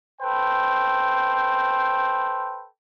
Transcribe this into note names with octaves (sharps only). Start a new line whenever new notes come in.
A4 B4 C5 G5